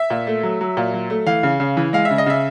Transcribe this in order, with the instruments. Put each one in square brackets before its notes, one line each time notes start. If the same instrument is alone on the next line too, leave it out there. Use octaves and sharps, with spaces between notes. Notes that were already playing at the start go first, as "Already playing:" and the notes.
Already playing: [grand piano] E5
A#2
A3
F#3
F#3
A#2
F#3
A3
E3 F5
C#3
C#3
E3
G#3 F5
E5
C#3
D#5
C#3 E5